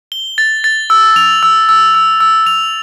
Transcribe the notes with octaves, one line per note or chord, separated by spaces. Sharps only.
G7
A6
A6
E6
F7
E6
E6
E6
E6
F7